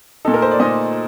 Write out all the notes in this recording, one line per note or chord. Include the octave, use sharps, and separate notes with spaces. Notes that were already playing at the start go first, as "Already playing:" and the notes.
A#2 A3 D#4 A4
A#4
C5
D5
A#2 A3 D#4 D#5